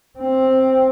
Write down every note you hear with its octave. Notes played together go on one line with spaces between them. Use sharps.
C4